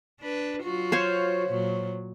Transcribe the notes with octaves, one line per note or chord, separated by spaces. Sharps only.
D4 B4
F#3 F4 F#4
C5 C#5 F5
A#2 F#3